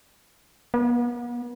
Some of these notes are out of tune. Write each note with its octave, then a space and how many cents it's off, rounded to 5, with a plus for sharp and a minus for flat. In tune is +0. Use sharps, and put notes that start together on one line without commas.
B3 -40